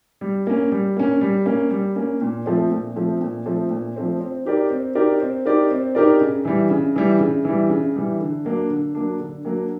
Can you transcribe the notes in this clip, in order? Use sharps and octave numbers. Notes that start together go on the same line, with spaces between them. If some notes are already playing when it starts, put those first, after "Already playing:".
G3
A#3 C#4
G3
A#3 C#4
G3
A#3 C#4
G3
A#3 C#4
A#2
F3 A3 C4
A#2
F3 A3 C4
A#2
F3 A3 C4
A#2
F3 A3 C4
C4
D#4 G4 A#4 D5
C4
D#4 G4 A#4 D5
C4
D#4 G4 A#4 D5
C4
D#4 G4 A#4 D5
C#3
E3 G3
C#3
E3 G3
C#3
E3 G3
C#3
E3 G3
D3
F#3 A#3 D4
D3
F#3 A#3 D4
D3
F#3 A#3 D4